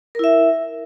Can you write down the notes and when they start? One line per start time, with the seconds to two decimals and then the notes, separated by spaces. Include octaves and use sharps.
0.15 A#4
0.19 E4
0.24 E5